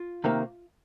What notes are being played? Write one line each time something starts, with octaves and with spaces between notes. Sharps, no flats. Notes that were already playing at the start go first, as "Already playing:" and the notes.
Already playing: F4
C3 D#3 A#3